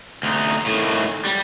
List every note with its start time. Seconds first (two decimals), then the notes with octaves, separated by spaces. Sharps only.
0.23 D2 D#4
0.66 A2 D#3
1.25 G3